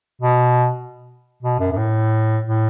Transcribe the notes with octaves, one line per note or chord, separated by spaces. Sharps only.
B2
B2
F#2
F#2
A2
A2